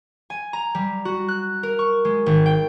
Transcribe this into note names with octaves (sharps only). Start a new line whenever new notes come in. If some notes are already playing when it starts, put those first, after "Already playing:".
G#5
A#5
G3
F#4
F#6
A#4
C#6
G#3
G#1
G5